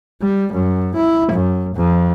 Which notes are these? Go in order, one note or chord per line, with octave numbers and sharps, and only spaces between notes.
G3
F#2
E4
F#2
F2